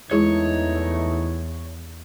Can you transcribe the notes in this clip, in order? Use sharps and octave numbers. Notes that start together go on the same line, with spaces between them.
E2 E3 G#3 A3 D#4 E4 G#4 C#5